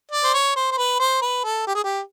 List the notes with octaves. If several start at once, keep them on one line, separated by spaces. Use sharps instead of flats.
D5
C5
C#5
C5
C5
B4
C5
B4
A4
G4
G#4
G4